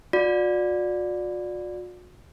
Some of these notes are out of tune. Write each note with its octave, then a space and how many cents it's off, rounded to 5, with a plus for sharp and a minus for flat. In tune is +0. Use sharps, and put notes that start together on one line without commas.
F#4 -45 D5 +5